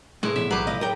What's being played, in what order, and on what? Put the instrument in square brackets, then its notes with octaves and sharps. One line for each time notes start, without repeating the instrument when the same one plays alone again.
[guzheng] A2 [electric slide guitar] C3 E4 B4 [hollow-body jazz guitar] G#3 [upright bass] A3
[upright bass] C3 E4 [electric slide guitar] E3 F3 B3 [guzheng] E5
[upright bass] B1 [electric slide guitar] E3 G#4 A#4 [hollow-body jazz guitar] F#3 [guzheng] G4 B4
[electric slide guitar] C#3 F3 G#3 [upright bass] F#3 [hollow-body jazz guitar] D#5 F5
[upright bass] F#3 [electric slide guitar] G#4 C#5 [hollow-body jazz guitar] A#4 G5